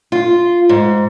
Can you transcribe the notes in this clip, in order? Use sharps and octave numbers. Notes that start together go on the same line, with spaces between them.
F4
G#2